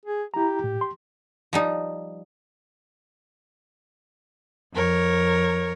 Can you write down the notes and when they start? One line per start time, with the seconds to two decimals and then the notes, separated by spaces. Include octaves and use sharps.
0.05 G#4
0.34 E4 G4 A#5
0.64 A2
0.81 C6
1.53 F3 G3 D#4
4.72 F2 A#4 C#5